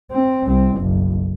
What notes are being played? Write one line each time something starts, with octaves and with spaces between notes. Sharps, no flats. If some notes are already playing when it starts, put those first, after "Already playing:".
C4
C2 C4
F#1 B1